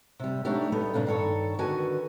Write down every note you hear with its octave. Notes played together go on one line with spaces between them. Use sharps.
C3 G3
F#3 A3 B3 D4 D#4 G4
G3 B3 D#4 A4
G2 A#2 C#3 D4 F4
G2 D#3 A4 C#5 A#5
D3 D#3 F#4 B4 G#5 A5